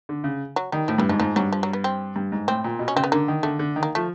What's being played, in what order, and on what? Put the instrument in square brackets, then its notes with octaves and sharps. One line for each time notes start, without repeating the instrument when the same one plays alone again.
[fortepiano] D3
C#3
[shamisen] F#3
[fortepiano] D#3 [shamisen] G3
[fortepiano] A2 [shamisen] F3
[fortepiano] G2 [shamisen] E3
[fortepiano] G#2 [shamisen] F3
[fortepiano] G#2 [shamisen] F3
[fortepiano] G2 [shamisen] F#3
[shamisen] F3
F#3
B3
C4
[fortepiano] G2
G#2
[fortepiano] A2 [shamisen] C4
[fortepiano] A#2
B2
[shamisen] C#4
[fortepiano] C#3 [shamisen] C4
[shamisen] B3
[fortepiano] D3 [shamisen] A#3
[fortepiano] D#3
[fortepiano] D3 [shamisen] A3
[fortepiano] D3
D#3
[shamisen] A#3
[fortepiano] F3 [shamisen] A3